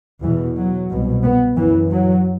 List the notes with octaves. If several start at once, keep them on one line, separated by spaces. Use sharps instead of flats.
E2 B2 E3
F#3
C2 B2
B3
F#2 E3
F#3